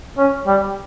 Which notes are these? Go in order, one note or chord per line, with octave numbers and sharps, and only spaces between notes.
C#4
G3